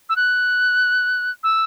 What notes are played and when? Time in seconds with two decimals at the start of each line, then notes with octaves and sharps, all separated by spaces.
0.09 E6
0.16 F#6
1.43 E6